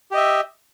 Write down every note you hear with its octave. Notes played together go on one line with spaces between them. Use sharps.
G4 D#5 E5